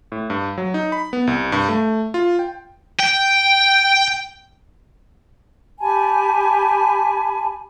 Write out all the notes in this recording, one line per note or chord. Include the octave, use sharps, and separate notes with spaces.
A2
G2
F#3
D#4
B5
B3
C2
G2
A3
F4
G5
G5
G4 G#5 A5 B5